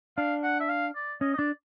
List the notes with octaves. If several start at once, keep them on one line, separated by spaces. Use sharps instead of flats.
D4 F5
F#5
E5
F5
D5
C#4 D#5
D#5
D4 D5